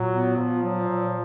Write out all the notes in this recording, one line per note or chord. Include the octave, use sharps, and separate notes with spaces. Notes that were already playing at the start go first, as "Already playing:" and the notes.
Already playing: A#2 F#3
B3
A#2 F3
F#3
A#2